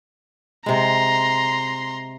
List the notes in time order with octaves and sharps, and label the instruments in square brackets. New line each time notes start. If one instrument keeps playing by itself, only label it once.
[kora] C3 G#3 [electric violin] A#5 C6